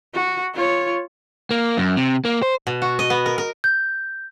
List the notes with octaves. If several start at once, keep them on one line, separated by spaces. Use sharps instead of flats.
F#4
F4 C#5
A#3
F#2
C3
A#3
C5
B2
F#4
D#5
B3
A#4
A#4
G6